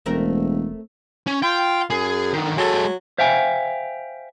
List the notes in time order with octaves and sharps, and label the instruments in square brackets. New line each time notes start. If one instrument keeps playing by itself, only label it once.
[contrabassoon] E1 [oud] A3 C4 A#4
[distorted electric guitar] C#4
[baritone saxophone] F4 [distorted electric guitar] G5
[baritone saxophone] F#2 [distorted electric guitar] G#4
[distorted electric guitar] D3 D#3
[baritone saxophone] F#3 [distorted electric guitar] G#3 A4
[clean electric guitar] C5 E5 F5 G5 G#5